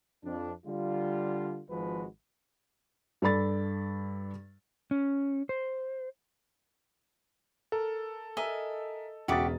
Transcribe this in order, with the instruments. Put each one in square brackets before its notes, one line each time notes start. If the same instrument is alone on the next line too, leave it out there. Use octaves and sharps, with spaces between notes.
[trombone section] F2 D4
D3 G3 F4
G#1 F3 G#3 F#4 B4
[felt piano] G2 A4 D5 B5 A6
[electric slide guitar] C#4
C5
[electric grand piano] A4 [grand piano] A#4
[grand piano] A#4 E5 G#5 [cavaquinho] D#5
[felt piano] E1 D#6 A6 [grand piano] C#3 E5 [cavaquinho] F#4 G4 D6